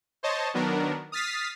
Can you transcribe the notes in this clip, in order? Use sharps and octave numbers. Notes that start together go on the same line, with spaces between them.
C5 C#5 D#5 A5
D#3 F#3 B3 D4 A#4
D#6 F6 A6 B6 C7